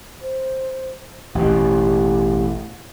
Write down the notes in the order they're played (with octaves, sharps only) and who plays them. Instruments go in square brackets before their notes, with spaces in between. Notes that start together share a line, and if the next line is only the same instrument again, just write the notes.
[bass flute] C5
[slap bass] A1 E2 B2 [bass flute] G4